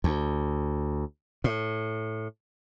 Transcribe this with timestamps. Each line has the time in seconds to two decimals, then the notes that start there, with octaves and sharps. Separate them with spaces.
0.04 D2
1.44 A2